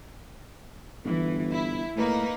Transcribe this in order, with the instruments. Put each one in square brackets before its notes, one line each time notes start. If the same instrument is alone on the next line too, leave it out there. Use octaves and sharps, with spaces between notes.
[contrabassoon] G1 [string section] E3
[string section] E4
[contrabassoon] A2 [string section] A#3 D#4 B4